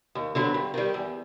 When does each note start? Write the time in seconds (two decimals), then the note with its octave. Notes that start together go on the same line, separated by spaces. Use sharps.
0.15 D#2
0.35 D3 F#3 B3
0.54 G2
0.74 D#3 G3
0.94 E2